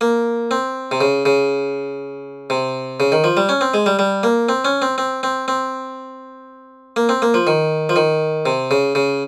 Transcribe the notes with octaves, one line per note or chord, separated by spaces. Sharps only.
A#3
C4
C3
C#3
C#3
C3
C#3
D#3
F3
G3
C#4
C4
G#3
G3
G3
A#3
C4
C#4
C4
C4
C4
C4
A#3
C4
A#3
F3
D#3
F3
D#3
C3
C#3
C#3